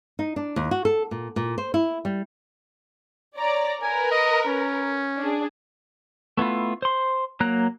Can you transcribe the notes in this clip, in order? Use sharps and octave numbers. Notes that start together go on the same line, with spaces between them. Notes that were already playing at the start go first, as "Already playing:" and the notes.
D#4
D4
D#2
F#4
A4
A#2
A#2
C5
E4
G3
C#5 D5 A#5
A#4 B4 G#5
D#5
C#4
D4 G#4
A3 B3 E4 F4
C5 C6
F#3 A#3 A#5 F#6